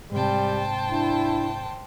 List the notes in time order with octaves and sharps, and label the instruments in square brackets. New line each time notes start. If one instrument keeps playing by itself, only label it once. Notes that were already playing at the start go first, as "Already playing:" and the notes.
[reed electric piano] G#2 C3 [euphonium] G3 [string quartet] C5 G5 A5
[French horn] D4 [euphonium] E4